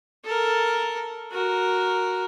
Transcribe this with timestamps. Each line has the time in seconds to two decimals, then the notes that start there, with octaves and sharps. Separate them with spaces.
0.25 A4 A#4
1.32 F#4 A#4